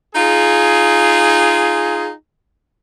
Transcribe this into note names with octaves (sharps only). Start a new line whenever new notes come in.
D#4 F4 G#4